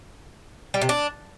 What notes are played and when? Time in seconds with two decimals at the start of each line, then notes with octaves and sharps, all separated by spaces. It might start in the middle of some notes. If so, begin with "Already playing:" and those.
0.74 G3
0.82 C3
0.89 D4